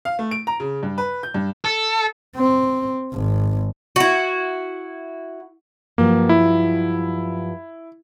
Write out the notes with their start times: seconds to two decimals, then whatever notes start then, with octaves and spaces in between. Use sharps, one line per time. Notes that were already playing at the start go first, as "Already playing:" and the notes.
0.05 F5
0.19 A3
0.31 D7
0.47 A#5
0.60 C#3
0.83 G2
0.98 B4
1.23 G6
1.34 G2
1.65 A4
2.36 C4
3.14 G#1
3.96 E4 F#4
5.98 G2 F3 F#3 A#3
6.29 E4